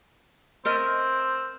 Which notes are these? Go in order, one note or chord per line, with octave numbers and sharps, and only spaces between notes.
A3 C4 A#4 D#5